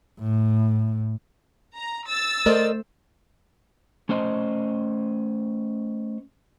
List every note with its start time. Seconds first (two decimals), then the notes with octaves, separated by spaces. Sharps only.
0.19 A2
1.74 A#5
2.07 E6 A6
2.46 A3 A#4 C5 D5 D#5
4.09 A3 C#4 C5 D#5